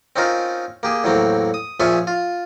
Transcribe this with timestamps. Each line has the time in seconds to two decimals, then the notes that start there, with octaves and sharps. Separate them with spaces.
0.16 C4 C#4 D#4 F4 A#4
0.83 A#3 G4 G#4
1.04 E2 A2 F#3 A#3 C4
1.54 D#6
1.80 A#2 F3 C#4 F4 G#4 E5
2.07 F4